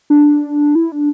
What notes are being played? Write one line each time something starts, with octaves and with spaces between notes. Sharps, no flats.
D4
E4
D4